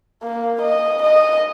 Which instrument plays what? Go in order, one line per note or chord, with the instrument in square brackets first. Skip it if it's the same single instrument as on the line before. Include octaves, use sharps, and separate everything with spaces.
[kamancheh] A#3
D#5
D#5